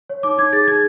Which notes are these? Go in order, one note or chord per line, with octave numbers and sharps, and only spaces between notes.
C#5
D#4 D6
D#4 G#6
G#4 A6
D#4 G#6